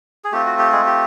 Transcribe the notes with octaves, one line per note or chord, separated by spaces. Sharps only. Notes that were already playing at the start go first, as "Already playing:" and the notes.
G#4
A3 C4 F4 G4
F#4
G4
G#3 G#4
G4